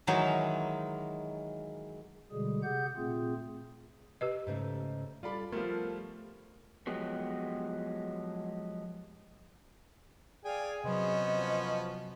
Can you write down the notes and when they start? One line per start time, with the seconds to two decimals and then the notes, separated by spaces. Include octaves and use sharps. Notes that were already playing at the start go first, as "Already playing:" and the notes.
0.07 D#3 E3 F#3 G#3 D#4
2.32 B2 D3 G3 G#3 G#4
2.63 C3 G4 G#4 F#5 G6
2.96 A#2 A3 C4 F4 G#4
4.21 G4 B4 D#5
4.47 G#2 C#3 A3
5.23 G3 F4 A4 D5 B5
5.52 F3 G3 A3 B3 F4 A#4 G#6
6.87 F3 F#3 G#3 B3 G4
10.45 G#4 D5 F5 G5 G#5
10.84 C3 F#3 B3 C#4 C5 D#5
11.36 F3